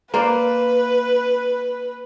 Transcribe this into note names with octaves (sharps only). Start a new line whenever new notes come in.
A#3 B4 C5 D5